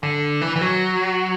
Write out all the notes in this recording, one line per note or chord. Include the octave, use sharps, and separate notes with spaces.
D3
E3
E3
F#3